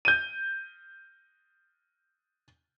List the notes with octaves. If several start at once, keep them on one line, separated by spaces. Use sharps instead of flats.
G6 D#7